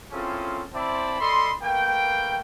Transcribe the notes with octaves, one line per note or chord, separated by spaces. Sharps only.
C4 C#4 E4 F4 G#4 A4
C4 E4 C5 D5 A5 B5
A4 D5 D#5 B5 C6
A3 A#3 B4 G5